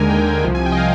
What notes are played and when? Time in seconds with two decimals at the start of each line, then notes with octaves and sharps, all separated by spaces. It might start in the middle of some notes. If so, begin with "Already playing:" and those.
Already playing: D#2 D3 G#3 A#4 G#5
0.10 G5
0.44 C2 C3 F3
0.55 G#5
0.66 G5
0.72 D#5
0.77 F5